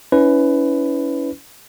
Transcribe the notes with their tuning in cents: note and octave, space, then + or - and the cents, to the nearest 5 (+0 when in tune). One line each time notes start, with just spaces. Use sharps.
C#4 +20 E4 -25 B4 +15